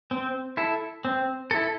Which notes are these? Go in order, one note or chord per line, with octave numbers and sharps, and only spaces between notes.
C4
E4 A4
C4
E4 A4